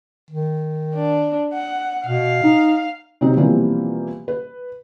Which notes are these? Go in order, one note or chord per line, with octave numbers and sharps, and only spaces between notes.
D#3
D4
F#5
B2 F5
D#4
C3 F#3 C4 D#4
B2 E3 F3 G3 A#3 C4
B4